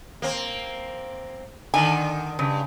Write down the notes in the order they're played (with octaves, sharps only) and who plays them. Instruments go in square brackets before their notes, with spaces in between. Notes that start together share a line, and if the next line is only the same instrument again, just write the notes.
[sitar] A#3 C4
[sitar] D3 D#3 [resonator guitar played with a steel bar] G#5
[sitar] G2 [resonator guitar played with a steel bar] C#3